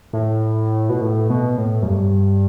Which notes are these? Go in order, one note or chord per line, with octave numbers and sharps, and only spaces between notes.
A2
B2
A2
B2
A2
F#2
G2